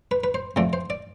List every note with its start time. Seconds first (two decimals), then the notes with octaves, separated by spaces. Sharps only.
0.11 B4
0.24 B4
0.34 C5
0.56 C3 F3 A3 D5
0.73 C5
0.90 D5